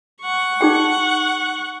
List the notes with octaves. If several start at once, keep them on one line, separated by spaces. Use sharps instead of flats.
F#5 C#6
D#4 G#4 G5